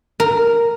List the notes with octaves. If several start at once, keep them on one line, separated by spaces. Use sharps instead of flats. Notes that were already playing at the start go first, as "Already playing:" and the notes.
A#4